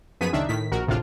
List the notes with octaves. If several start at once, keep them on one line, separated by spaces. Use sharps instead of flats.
F#2 F3 B3 G#4 B6 D#7
C#2 D#3 D4 E5
A2 D#3 B6
A#1 F#4 A#4
G#1 D2 A2 C3 D4 F4